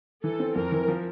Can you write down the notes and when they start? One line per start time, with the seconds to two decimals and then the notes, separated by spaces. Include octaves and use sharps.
0.24 E3 A4
0.40 C4
0.56 F2 A#4
0.72 E3
0.88 F3